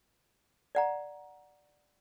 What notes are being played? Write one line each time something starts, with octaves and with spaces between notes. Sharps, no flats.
D5 F#5 A#5